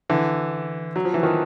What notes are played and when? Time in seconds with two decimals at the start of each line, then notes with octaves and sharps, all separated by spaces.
0.10 D3 E3
0.96 F#3
1.05 F3
1.14 E3
1.23 D#3 F3